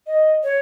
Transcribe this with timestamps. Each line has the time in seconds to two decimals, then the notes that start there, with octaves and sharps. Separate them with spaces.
0.07 D#5
0.43 C#5